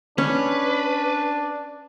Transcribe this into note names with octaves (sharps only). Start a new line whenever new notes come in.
C#4 D4 B4